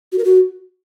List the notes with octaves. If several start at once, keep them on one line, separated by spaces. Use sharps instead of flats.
F#4
A#4
F#4